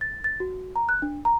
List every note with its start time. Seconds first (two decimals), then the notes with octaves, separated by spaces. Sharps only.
0.01 A6
0.24 A6
0.40 F#4
0.76 A#5
0.89 F#6
1.02 D4
1.25 A#5